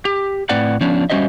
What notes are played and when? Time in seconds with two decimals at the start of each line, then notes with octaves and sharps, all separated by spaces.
0.05 G4
0.49 A2 C4 B4 D5 F#5
0.81 F3 B3 C#4 D4
1.10 G3 C#4 F#4 C5 D#5 E5